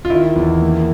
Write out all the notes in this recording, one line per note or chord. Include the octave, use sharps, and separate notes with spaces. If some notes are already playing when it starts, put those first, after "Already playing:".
F4
D#3 E4
E2
A#3